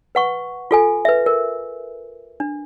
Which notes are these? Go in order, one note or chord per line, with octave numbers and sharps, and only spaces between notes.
B4 F#5 C#6
F4 A4 G#5
B4 E5
A#4
D4